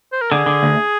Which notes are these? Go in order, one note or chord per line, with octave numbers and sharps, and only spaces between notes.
C5
A#4
D3 G#4
D3
D2